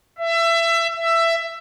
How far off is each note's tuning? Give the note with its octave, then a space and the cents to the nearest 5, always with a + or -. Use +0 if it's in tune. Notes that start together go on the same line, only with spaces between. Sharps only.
E5 +25
E5 +15